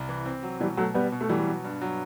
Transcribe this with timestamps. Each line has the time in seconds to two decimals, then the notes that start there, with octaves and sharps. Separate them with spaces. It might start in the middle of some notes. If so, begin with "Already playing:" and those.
Already playing: C2
0.09 E3
0.26 C4
0.43 F#3
0.60 B2 E3 G3
0.77 B2 F#3 A3
0.94 B2 G3 B3
1.12 B2
1.21 A3
1.29 E3 F#3 G3
1.47 B2
1.64 G2
1.81 F#3